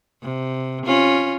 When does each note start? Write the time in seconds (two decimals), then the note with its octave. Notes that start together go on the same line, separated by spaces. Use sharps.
0.22 C3
0.86 C#4 F4